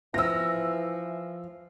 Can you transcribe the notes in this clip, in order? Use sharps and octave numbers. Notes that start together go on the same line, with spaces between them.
E3 F3 F4 E6 A#6